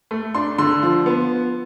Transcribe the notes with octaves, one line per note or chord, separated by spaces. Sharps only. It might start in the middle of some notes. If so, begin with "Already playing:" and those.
A3
D4 C6
D3 C6
F3
B3